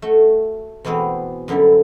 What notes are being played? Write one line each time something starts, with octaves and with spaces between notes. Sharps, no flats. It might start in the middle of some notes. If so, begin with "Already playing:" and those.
A3 F#4
E2 B2 G#3 B3 C4
F#2 D3 G3 C4 E4